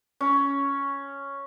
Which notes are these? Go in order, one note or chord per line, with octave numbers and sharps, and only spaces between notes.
C#4